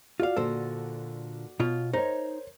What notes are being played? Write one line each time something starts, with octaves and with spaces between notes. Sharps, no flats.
F4 F#4 D5 F5
A#2 D3 A4 C5
B2 F4 C#5
D#4 A#4 C5 C#5